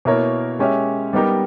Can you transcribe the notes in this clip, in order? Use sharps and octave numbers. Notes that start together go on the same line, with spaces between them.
B2 A#3 E4 A#4 C#5
G#3 C#4 G4 C#5 E5
G3 B3 D#4 G4 A#4